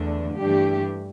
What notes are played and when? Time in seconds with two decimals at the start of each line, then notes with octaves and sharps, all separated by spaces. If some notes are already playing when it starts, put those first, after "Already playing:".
Already playing: E2 D3 A3 D4
0.38 G2 E3 A3 D4 G4